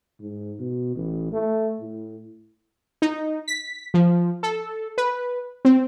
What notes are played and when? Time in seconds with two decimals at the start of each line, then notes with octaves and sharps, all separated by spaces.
0.21 G#2
0.60 B2
0.96 A1
1.33 A3
1.81 A2
3.02 D#4
3.48 B6
3.94 F3
4.43 A4
4.98 B4
5.65 C4